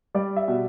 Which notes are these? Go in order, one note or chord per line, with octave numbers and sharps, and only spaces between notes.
G3 D5
E5
B2